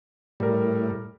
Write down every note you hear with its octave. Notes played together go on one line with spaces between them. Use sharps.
A2 G3 A#4